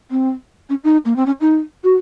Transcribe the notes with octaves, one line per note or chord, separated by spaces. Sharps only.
C4
C#4
D#4
A#3
C4
C#4
D#4
F#4